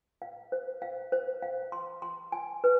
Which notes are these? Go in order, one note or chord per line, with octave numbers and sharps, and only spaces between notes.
F5
C5
F5
C5
F5
C6
C6
G#5
B4